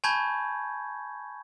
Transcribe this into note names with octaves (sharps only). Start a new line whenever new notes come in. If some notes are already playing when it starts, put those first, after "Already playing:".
G#5 A5 B5 C#6 G6 G#6